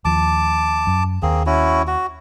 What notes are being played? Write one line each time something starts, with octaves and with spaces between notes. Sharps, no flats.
D#2 F3 A5 D6
F#2
D#2 A#3 C4 G#4
C#4 E4 F#4
F#4